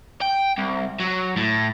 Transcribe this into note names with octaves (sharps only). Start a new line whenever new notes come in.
G5
C2
F#3
A2